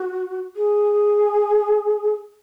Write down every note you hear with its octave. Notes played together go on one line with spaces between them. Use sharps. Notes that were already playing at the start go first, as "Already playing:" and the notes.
Already playing: F#4
G#4